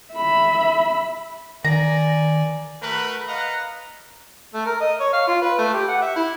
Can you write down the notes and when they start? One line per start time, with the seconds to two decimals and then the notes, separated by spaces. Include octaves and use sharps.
0.13 E5 B5
1.64 D#3 D5 G#5 A#5
2.82 A3 F#4 A#4 B4
3.27 B4 D#5 F5 F#5 A#5
4.54 A3
4.66 A#4
4.80 D#5
5.00 C#5
5.13 F5
5.27 F4
5.42 B4
5.58 A3
5.73 G4
5.89 F#5
6.01 E5
6.16 E4